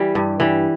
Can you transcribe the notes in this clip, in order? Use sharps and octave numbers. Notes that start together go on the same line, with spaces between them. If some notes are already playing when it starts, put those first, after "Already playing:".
Already playing: E3 G3 G4
G2
E3 G3